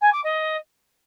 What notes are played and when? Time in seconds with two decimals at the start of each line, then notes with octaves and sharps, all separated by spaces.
0.01 G#5
0.12 D6
0.23 D#5